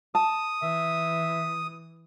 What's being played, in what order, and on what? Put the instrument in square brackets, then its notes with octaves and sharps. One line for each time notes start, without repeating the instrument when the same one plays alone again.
[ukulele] A5 [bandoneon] D#6
[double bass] E3 [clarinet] E5